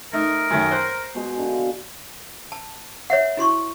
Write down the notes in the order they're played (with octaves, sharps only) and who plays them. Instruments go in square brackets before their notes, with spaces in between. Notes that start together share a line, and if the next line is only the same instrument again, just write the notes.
[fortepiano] A3 D#4 [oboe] A#4
[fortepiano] F#2 D#3 A3
C5 F#6
[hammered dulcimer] B2 G#3
D3 F5
[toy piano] A5
C#5 E5 F#5
E4 F#4 C6 C#6